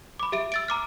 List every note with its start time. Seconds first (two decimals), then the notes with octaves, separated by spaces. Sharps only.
0.20 B5 D6
0.32 G4 E5 D7
0.52 E6 A6 D7
0.68 A#5 D6 F6